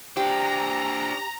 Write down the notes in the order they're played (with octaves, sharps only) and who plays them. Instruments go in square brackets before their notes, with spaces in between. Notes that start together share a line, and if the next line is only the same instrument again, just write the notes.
[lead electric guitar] D4 C5 [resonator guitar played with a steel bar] G4 [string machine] A#5